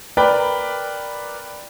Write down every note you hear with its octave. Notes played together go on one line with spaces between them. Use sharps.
A#4 B4 D5 G5 B5